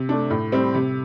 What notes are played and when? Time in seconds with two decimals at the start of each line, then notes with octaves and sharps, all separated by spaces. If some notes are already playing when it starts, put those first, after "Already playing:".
Already playing: C3
0.09 A3 D4
0.31 A2
0.52 G3 C4 G4
0.75 C3